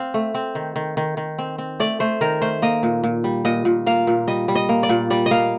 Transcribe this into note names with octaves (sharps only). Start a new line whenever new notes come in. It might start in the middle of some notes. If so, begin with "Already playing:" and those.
Already playing: C4 F5
A3
C4
D#3
D#3
D#3
D#3
C4
C4
A3 D5
A3 C5
D#3 A#4
A3 C5
A#3 D#5
A#2
A#2
G3
A#2 D#5
A#2
A#3 F5
A#2
G3 D#5
G3
D#5
A#3
D5
A#2
G3 D5
D#5
A#3 F5